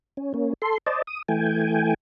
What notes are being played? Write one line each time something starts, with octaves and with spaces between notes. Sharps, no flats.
C#4
A#3 C#4
A4 C6
C5 D5 D#5 A5
D#6
E3 A3 G5 G#5